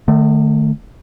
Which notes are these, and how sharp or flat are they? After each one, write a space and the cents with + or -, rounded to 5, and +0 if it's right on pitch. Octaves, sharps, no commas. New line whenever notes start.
D#3 -45 A3 +0